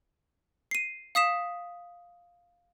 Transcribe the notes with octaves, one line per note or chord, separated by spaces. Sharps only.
C7 D#7
F5 D#6 B6 E7